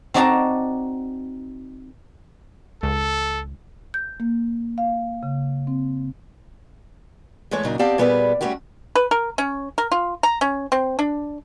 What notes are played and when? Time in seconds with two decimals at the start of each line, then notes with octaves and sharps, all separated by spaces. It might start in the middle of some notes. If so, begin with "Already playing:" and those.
0.14 C4 D#4 F#4 D5 A5 A#5
2.83 C#2 A4
3.94 G6
4.20 A#3
4.78 F5
5.23 C#3
5.67 C4
7.51 E2 E3 G#3 A3 C#5
7.64 A#2 C#3 F#3 D4 D#4
7.79 B3 C4 G4 D5 F5 A5
7.98 A#2 G3 B3 G#4 B4 D5
8.41 G3 A3 C4 C#4 F#4 G4
8.95 B4
9.11 A#4
9.38 C#4
9.78 A#4
9.92 F4
10.23 A#5
10.41 C#4
10.72 C4
10.99 D4